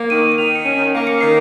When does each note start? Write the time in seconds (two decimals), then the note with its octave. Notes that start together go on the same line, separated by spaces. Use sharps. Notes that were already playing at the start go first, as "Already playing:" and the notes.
Already playing: A#3 C#7
0.10 D#3 D#7
0.32 D#7
0.38 D#3 F7
0.55 C#7
0.65 C#4 D#7
0.93 A#3
1.07 C#7
1.21 D#3 C7